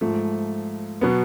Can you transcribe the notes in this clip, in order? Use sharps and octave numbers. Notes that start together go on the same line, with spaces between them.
G#2 F3 A3
B2 F#3 B3